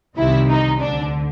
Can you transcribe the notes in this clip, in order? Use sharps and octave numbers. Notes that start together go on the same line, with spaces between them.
C2 C3 D#3 E4
D#4
D2 D3 D4